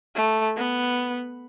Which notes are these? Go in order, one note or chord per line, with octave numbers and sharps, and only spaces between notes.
A3
B3